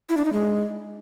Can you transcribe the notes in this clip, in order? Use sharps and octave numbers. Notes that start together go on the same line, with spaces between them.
E4
D4
D#4
G#3